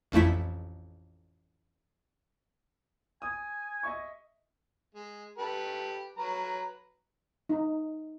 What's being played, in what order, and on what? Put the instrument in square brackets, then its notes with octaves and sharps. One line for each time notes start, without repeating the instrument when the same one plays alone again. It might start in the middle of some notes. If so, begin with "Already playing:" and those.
[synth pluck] A1 F2 A3 E4 B6
[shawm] G#5 [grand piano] D#6
[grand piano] D#5 E5 C#6
[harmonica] G#3
G4 A4 B4
F#3 B4 A#5
[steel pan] D#4